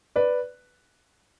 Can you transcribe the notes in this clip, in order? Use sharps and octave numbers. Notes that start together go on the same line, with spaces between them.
B4 D5